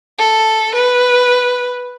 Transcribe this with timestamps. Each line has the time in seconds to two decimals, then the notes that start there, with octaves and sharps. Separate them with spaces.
0.19 A4
0.75 B4